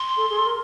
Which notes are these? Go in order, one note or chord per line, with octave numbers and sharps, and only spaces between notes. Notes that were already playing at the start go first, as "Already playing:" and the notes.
Already playing: C6
A4
G#4
A4
A#4